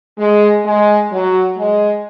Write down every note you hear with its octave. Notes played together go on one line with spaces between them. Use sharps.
G#3
G#3
F#3
G#3